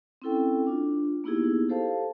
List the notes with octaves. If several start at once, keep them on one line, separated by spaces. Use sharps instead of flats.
C4 C#4 E4 A4 G5
D4 F4
A#3 B3 D#4 E4 G4 G#4
G4 A4 C5 F5 A5